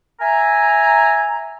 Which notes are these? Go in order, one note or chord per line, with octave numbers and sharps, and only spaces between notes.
E5 G#5 A#5